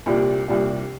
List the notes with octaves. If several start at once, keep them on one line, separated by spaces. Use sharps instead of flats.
C2 A#2 G3 D4 G4
C2 A#2 G3 D4 G4